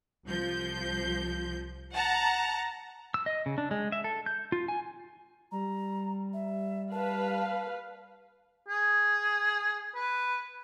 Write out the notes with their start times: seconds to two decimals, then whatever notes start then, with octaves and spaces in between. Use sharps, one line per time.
0.25 C2 F3 G6
1.92 F#5 A5 A#5
3.14 E6
3.26 D#5
3.46 C#3
3.58 D4
3.71 G#3
3.92 E5
4.04 A4
4.26 G6
4.52 F4
4.68 G#5
5.52 G3 A#5
6.33 E5
6.92 B4 F5 A5
8.68 G#4
9.96 B4